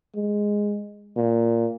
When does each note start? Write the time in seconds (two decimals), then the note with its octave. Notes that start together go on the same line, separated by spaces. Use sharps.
0.16 G#3
1.17 A#2